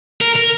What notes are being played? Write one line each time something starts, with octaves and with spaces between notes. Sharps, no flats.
A#4
A#4